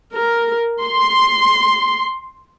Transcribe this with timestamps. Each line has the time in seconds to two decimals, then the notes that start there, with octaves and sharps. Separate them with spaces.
0.12 A#4
0.82 C6